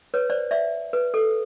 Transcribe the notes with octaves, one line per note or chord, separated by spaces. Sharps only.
B4 C#5
C5 D5
D5 E5
B4
A4